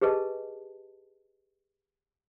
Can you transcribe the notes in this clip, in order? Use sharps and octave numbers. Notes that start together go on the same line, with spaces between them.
G4 G#4 B4 D#5 G#5 A5